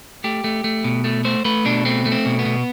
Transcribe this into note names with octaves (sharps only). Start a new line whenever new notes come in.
A3 G4
A3
A3
B2
A3
A3 C5
A3 B4
B2 D4
A3 C4
A3
C4
B2
B3
B2